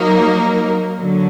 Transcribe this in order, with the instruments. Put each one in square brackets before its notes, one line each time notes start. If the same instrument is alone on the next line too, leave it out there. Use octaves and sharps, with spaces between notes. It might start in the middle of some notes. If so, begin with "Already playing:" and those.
Already playing: [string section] F#3 A#3 D#4 A#4
D3 F#3